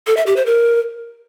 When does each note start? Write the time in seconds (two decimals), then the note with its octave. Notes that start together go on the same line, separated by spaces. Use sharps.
0.07 A4
0.17 E5
0.27 G4
0.36 C5
0.46 A#4